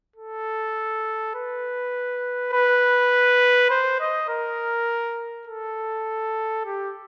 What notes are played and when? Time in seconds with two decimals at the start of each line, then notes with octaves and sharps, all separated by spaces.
0.16 A4
1.35 B4
2.53 B4
3.71 C5
4.01 D#5
4.29 A#4
5.47 A4
6.65 G4